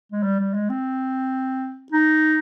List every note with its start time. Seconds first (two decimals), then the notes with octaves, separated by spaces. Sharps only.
0.12 G#3
0.23 G3
0.39 G3
0.54 G#3
0.70 C4
1.92 D#4